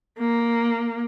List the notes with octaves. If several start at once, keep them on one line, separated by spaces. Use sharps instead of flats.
A#3